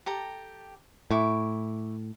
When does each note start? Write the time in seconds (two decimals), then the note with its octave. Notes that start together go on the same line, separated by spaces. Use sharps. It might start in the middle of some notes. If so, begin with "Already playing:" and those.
0.06 G4 A4 A#5
1.11 A2 E4 C#6 D6